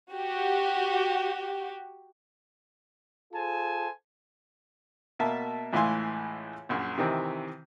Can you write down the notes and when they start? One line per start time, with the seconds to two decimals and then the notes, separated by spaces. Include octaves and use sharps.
0.12 F#4 G4
3.33 F4 G#4 A4 C5 G#5 A5
5.19 B2 A#3 E5 A5
5.73 C#2 A2 E3 F5 G#5 C6
6.69 A#1 F#2
6.98 C3 D#3 E3 C4